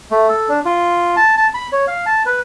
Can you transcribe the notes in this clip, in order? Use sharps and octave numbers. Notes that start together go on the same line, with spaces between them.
A3
A4
D4
F4
A5
A5
B5
C#5
F5
A5
B4